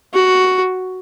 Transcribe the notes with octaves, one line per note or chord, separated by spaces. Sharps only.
F#4